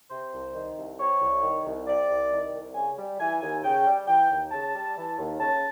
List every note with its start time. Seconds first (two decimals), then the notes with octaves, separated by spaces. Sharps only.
0.10 C3 C5
0.33 C2
0.55 D#3
0.77 C2
0.99 C3 C#5
1.21 C2
1.43 D#3
1.65 C2
1.87 C3 D5
2.09 C2
2.31 D#3
2.53 C2
2.75 C#3 G#5
2.98 G3
3.20 E3 G#5
3.41 D#2 G#5
3.64 C#3 G5
3.86 G3
4.07 E3 G5
4.30 D#2
4.51 C#3 A5
4.74 G3
4.96 E3
5.18 D#2
5.40 C#3 A5